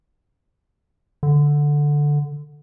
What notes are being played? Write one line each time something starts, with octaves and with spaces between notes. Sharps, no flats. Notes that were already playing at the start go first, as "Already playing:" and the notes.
D3